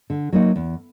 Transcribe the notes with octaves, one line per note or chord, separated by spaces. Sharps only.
D3
F#3 A#3 D#4 F#4
E2